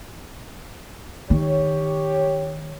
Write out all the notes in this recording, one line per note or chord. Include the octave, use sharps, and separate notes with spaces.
D#3 G4 C#5